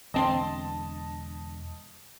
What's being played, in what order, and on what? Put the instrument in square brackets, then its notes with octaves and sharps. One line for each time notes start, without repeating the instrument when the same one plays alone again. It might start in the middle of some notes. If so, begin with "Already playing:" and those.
[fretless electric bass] E1 D3 [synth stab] A1 C4 C6 [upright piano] D#5 A5